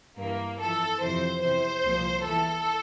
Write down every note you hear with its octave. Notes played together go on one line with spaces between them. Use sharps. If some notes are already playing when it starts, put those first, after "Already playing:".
G2 E3 A#3
F2 E3 A4
F2 C3 E3 C5
E2 C3 E3 C5
C2 A#2 F3
E2 E3 A4